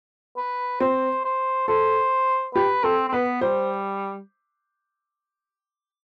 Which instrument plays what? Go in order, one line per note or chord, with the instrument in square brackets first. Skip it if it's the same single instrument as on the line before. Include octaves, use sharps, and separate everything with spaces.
[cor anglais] B4
[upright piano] C4 [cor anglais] C5
[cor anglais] C5
[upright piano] A4 [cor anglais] C5
[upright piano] G4 [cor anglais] B4
[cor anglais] C4 [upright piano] A4
[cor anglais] C4
[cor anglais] B3 [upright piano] B4
[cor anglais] G3 [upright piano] C5